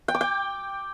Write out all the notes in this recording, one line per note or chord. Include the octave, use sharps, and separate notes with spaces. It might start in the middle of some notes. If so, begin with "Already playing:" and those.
G5
D6
G5